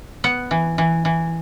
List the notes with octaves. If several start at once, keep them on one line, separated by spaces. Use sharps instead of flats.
B3 F#5
E3
E3
E3